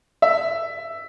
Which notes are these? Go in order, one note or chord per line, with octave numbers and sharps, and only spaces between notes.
E5